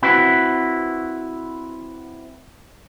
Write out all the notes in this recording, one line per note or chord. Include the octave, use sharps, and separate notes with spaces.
C4 E4 F#4 B4